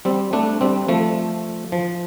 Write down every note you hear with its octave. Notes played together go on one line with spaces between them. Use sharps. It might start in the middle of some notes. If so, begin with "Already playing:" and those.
G3 C4
A3 D4
G3 C4
F3 A3
F3